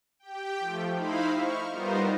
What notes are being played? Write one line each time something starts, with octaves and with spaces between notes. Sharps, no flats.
G4 G5
F3 A3
D#4 E4 C5 F5 B5
C#6 F6
G3 B3 D#4 F4 A#4 C5